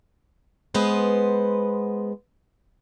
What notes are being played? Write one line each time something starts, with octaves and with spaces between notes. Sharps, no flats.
G#3 B3 B4 C5